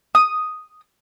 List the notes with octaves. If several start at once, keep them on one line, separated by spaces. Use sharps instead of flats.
D#6